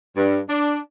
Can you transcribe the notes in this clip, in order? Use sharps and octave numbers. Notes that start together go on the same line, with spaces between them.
G2
D4